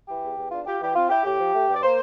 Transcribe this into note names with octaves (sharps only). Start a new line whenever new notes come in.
E3 G4
E2
E2
D4 F4
F4 G4
E3 G4
C4 F4
E4 G4
A2 G4
F3
A3
G2
D5
A#3 C5